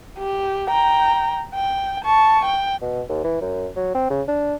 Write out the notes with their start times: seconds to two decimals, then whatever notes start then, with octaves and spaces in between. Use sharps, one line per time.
0.19 G4
0.70 G5 A#5
1.55 G5
2.05 A5 C#6
2.45 G5
2.82 B2
3.09 D#2
3.24 E3
3.41 F#2
3.76 F#3
3.94 C4
4.10 C#3
4.28 D4